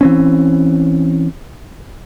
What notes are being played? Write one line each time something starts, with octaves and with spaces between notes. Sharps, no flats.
E3 C4 C#4